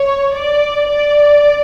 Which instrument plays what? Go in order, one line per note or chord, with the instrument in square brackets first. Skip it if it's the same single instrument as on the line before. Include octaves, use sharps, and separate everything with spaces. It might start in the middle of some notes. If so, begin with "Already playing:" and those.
Already playing: [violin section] C#5
D5
D5